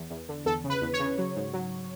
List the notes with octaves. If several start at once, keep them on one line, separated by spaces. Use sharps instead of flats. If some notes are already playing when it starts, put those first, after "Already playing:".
Already playing: E2
E2
D3
E2 A4
C#3
B4
E2
C#5
C#3
F#3
G#2
F#3